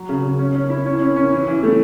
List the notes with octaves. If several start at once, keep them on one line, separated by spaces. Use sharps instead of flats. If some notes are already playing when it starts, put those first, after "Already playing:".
Already playing: F#3
C#3
C#3
C#4
C#4
E4
C#4
C#4
C#4
E3
E3
A3